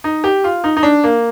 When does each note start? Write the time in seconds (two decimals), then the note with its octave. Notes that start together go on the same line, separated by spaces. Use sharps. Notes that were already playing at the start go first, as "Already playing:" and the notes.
0.04 D#4
0.24 G4
0.44 F4
0.64 D#4
0.77 D#4
0.83 D4
1.04 A#3